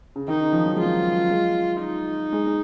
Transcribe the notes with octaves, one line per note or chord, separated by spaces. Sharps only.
C#3
D#3 D#4
C#3
F3
F#3
G#3 F4
F#3
G#3
D#4
G#3
G#3